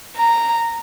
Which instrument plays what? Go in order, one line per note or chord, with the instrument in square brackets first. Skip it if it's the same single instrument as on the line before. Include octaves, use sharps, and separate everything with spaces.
[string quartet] A#5